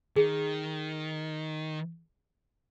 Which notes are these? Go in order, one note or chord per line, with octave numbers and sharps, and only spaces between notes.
D#3 G#4